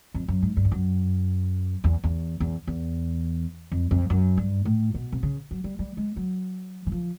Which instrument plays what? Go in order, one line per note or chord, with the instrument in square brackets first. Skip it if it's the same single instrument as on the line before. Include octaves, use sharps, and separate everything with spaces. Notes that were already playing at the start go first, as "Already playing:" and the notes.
[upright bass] F2
F#2
G#2
G2
F2
F#2
E2
E2
E2
E2
F2
F2
F#2
G2
A2
B2
C3
C#3
F#3
G3
G3
G#3
F#3
E3
F3